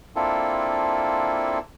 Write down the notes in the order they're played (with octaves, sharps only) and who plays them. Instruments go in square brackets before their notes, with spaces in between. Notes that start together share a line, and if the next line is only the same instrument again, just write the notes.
[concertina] A#3 C4 D4 E4 F4 A4